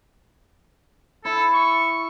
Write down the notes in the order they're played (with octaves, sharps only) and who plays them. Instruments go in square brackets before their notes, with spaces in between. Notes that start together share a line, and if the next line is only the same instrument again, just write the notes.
[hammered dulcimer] E4 [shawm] A4
[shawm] C#6